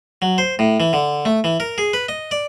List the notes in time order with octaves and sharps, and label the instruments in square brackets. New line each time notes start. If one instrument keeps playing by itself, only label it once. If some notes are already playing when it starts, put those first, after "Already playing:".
[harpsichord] F#3
C5
A2
E3
D3
A3
E3
A#4
G#4
B4
D#5
D5